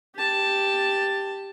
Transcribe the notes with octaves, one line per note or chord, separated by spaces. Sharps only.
G4 A5